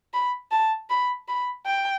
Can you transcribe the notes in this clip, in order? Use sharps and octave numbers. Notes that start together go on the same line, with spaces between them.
B5
A5
B5
B5
G5